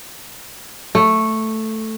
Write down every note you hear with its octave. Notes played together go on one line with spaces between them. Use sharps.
A3